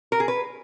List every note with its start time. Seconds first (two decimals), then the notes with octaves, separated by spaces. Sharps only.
0.12 A#4
0.20 G#4
0.28 B4